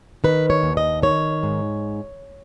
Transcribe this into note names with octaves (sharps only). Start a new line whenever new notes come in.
D#3 B4
C#5
D#2
D#5
D#3 C#5
G#2